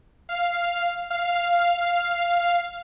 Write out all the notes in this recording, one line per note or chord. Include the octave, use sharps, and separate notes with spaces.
F5
F5